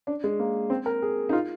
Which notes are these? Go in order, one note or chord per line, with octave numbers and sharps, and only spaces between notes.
D4
G#3
A#3
C4
A#4
G#4
D#4
F4